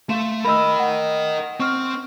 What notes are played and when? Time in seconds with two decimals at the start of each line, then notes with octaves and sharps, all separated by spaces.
0.09 A3 F5 C6 E7
0.44 A#4 D#5 B5 E6
0.79 F#5
1.60 C4 C#6 F6